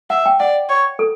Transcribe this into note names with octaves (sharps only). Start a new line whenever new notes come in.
E5 F#5
G5
D5 F#5
C#5
A4